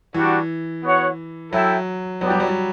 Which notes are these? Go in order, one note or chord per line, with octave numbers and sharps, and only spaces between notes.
E3 G3 D4 F#4
B3 F#4 C#5 F#5
F#3 E4 A4 E5 G5
F#3 B3 D4 G4
G3
F#3
G3